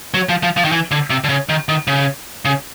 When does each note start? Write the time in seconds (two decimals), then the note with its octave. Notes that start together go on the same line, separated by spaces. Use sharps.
0.14 F#3
0.29 F3
0.43 F3
0.57 F3
0.65 D#3
0.72 E3
0.91 D3
1.10 C3
1.24 D3
1.29 C#3
1.49 D#3
1.69 D#3
1.87 C#3
2.45 C#3